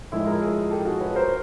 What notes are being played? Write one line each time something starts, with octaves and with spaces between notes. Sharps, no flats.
A2 F3 G#3 E4
G#4 A#4
G#4 A#4
G4 A4
F#4 G#4
B4 C#5
A#4 C5